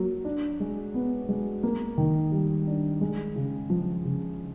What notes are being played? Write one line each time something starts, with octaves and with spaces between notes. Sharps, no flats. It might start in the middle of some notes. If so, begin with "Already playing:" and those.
Already playing: F#3 A#3
D4
G#3
B3
G#3
A#3
D#3
G3
D4
G#3
C#3
F3
C#3